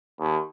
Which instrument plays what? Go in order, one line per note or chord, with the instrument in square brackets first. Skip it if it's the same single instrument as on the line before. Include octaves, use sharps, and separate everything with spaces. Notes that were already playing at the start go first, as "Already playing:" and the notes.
[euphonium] D#2